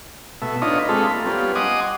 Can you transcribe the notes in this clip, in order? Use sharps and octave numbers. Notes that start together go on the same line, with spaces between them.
B2 A3 E5
D4 D#4 F4 B4 C#5 D#5
G#3 A3 C4 F4 A4 B5
A#3
G3 B3 C#4 F4
D#5 F#5 G#5 C6 D6 D#6